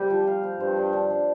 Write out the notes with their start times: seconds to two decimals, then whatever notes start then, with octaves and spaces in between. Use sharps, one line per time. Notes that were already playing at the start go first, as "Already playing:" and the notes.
Already playing: G3 C4 G4
0.10 F3
0.27 F5
0.43 C4
0.60 G2 C5
0.77 D4
0.93 D4
1.10 D4